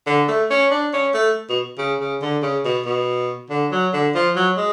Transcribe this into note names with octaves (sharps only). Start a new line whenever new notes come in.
D3
A3
C#4
D4
C#4
A3
B2
C#3
C#3
D3
C#3
B2
B2
D3
F#3
D3
F3
F#3
G#3